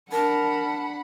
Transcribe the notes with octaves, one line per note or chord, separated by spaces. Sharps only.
D4 A#4 F#5 A5 B5